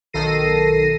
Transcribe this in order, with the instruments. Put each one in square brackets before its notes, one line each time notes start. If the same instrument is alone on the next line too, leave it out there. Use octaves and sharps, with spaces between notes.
[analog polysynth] B1 D#3 A4 A#6 C7 D#7